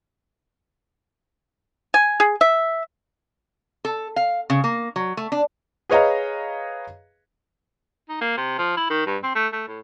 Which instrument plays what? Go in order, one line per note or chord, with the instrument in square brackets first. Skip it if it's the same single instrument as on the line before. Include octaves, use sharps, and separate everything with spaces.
[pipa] G#5
G#4
E5
[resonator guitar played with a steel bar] A4
F5
C#3
A#3
F#3
A3
D4
[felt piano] G#4 B4 C#5 D#5 F5 A#5
[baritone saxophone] D#4
A#3
C3
F3
E4
D#3
G2
C4
A3
A3
A2